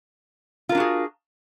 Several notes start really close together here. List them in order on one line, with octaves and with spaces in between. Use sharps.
F4 A#4 D4 F#4 G#4